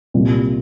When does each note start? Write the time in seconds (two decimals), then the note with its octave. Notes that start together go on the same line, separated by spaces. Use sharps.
0.14 C2 A#2 G3